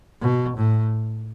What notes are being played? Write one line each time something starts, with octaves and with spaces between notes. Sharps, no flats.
B2
A2